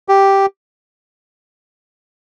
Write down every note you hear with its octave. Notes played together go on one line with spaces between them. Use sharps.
G4